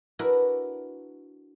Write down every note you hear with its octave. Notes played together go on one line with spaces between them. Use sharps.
D4 E4 F#4 A#4 B4